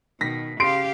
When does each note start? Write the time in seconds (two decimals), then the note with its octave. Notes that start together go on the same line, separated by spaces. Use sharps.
0.21 B2 D#3 A#6 B6
0.60 C#3 G4 F5 C6 C7 D7